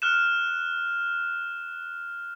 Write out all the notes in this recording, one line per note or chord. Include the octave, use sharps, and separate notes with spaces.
F6 F#6 E7